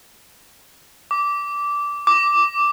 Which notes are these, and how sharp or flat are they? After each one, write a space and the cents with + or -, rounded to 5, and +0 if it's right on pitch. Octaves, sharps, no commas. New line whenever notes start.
D6 -15
D6 -5